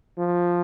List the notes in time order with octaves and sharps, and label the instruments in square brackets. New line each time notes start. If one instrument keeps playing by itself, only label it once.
[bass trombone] F3